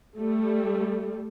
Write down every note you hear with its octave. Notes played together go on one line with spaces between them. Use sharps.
G3 A3